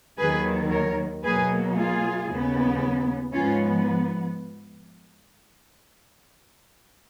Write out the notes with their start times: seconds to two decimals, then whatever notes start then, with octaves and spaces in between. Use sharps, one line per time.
0.18 D#2 D#3 F#3 G#4 B4
0.71 A#4 C#5
1.23 B2 F#3 A#3 G#4 B4
1.76 F4 G#4
2.28 D#2 C#3 F#3 B3
3.32 G#2 F3 B3 C#4 F4